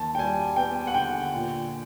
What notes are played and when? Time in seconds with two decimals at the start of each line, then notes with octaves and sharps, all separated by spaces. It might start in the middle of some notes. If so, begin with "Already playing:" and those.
Already playing: D#2 A5
0.15 G5
0.18 G3 G#5
0.56 B3 G5
0.87 F#5
0.94 D3 G5
1.33 A#2